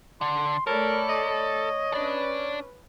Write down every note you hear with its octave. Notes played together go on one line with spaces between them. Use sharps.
D3 C6
A3 A4 A#4 C#5 D5 B5
D#5
C#4 D4 B4 D5